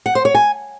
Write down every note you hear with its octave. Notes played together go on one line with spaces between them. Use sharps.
F#5
C5
C#5
G#5